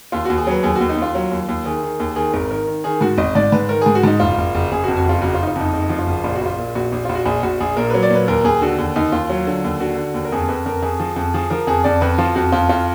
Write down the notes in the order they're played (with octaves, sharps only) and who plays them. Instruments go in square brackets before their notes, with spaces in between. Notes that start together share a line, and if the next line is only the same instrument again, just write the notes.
[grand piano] D#2 F4
D#2 F#4
G#4
F#3 B4
D#2 G#4
F#4
D#2
D#4
D#2 F4
F#3
D#2
D#2
D#3 G#4
D#3
D#2
D#3 G#4
G#1 A#4
D#3 A#4
D#3
D#3 G#4
G#2 F#4
G#1 D#5
G#2 D5
G#2 B4
D#3 A#4
G#2 G#4
F#4
G#2 D#4
F#1 F4
F#1
F#1
F#1 G#4
F#4
F2
F#4
F#1 F4
F#1 F#4
F4
F#1 D#4
F4
F2
D#4
F#1 D#4
F3
F4
F#1
A#1 F4
F#4
A#1 F4
A#2
A#1 F#4
A#1
A#1 F4
F#4
A#1 G#4
A#1 F#4
A#1 G#4
A#2 A#4
F#3 B4
D5
A#2 B4
D#2 A#4
D#2 G#4
D3 F#4
D#2
D#2 D#4
D#2 F4
F#3
D3
D#2
D3 F#4
D3
D#2
A#4
F2 G#4
F2 B4
F2 A#4
F2 G#4
F3
F2
F3 G#4
F3 A#4
F2 G#4
F2 D5
F2 B4
F3 F4
F2 F#4
F2 F4
F2 F4